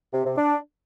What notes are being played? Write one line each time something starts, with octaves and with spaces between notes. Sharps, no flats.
C3
C3
D4